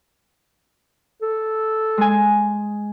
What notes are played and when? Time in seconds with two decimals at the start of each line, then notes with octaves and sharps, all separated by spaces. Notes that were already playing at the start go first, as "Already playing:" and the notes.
1.22 A4
1.98 G#3 G#5